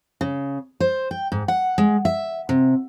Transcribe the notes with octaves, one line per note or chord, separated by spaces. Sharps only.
C#3
C5
G5
G#2
F#5
G#3
E5
C3